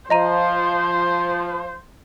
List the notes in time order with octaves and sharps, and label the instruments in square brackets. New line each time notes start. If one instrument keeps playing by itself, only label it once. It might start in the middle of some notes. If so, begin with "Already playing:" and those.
[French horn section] F3 [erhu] C5 [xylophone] D#5 A#5 D#7